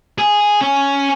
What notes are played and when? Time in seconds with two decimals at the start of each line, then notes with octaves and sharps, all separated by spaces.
0.18 G#4
0.61 C#4